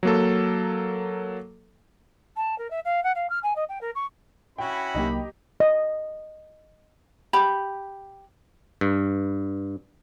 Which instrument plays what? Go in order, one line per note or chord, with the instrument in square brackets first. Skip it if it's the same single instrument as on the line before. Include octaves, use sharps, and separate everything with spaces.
[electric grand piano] F#3 A#3 A4
[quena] A5
A#4
E5
F5
F#5
F5
F6
G#5
D#5
G5
A#4
C#6
[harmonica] C#4 E4 F#4 [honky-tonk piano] G5 [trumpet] B5
[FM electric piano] C2 F#3 A#3 [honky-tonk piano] D#4 G4
[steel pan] D#5
[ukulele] G4 B5
[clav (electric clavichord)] G2